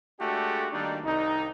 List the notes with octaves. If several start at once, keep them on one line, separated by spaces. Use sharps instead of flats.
G#3 A3 D4 F#4 G4 A4
D#3 G3 A#3 D4 D#4
C2 D#4